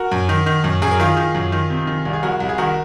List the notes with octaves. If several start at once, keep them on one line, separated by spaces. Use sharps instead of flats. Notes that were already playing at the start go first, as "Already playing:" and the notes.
Already playing: F#4 A#4
F#2
D#3
D#3
F#2
F#2 G#4
A#4
D#3 F4 G#4
D#3
F#2
D#3
C3
D#3
C2
G#4
C2 F#4 A#4
C2
G#4
D#3 F#4 A#4